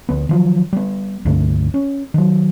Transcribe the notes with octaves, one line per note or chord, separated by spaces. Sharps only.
D2 B3
D#3 F3 F#3
G3 B3
C#2 G2 D3 A3
C#4
D#3 F#3